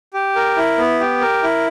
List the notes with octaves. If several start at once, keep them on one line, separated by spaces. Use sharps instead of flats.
G4
A#4
E4
B3
G4
A#4
E4